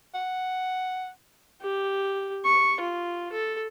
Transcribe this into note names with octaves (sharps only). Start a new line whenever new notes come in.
F#5
G4
C#6
F4
A4